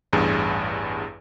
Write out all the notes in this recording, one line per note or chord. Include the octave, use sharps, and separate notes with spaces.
A1 E2 G2 G#4